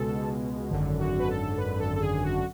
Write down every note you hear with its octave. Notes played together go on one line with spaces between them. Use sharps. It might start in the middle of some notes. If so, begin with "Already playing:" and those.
Already playing: C#2 B2 G#3 A4
G#1 F#2 D3
F#4
B4
A4
B4
A4
A4
G#4
F#4